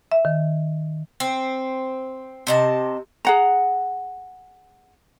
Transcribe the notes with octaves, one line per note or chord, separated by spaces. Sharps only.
E5
D#3
C4
C3 D#5 A5
G#4 F#5 A#5